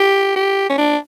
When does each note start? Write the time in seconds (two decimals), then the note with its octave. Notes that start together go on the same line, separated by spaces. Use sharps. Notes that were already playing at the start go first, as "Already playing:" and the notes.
Already playing: G4
0.36 G4
0.70 C#4
0.78 D4